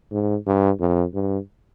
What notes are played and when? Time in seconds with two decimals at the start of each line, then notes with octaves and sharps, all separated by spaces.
0.12 G#2
0.47 G2
0.80 F2
1.14 G2